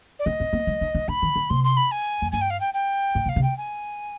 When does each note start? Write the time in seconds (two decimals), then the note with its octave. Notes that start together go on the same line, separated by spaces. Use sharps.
0.19 D5
0.26 C4 D#5
0.40 C4
0.53 B3
0.67 G#3
0.81 D4
0.95 D4
1.08 D4 B5
1.22 D#3
1.36 D3
1.50 C3 C6
1.64 C6
1.77 B5
1.91 G#5
2.22 F2
2.32 G2 G#5
2.41 G5
2.50 F5
2.60 G5
2.74 G5
3.15 G#2
3.26 B2
3.29 F5
3.36 C3
3.43 G5
3.57 G#5